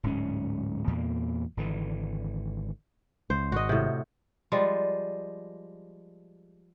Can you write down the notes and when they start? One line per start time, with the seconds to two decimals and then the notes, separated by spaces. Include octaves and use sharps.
0.03 D1 G#2 A#3 C#4
0.87 E2 A#2 A#3
1.57 G#1 D3 E3
3.30 C#2 C5
3.52 G#1 F#4 D#5
3.69 A2 C3
4.52 F3 G3 G#3